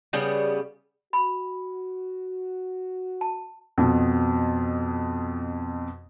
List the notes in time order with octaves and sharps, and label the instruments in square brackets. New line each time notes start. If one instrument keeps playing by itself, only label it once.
[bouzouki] C#3 G3 B3
[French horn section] F#4 [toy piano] B5
[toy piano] A5
[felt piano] F2 B2